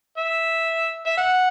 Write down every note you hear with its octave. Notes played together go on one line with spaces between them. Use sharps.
E5
E5
F#5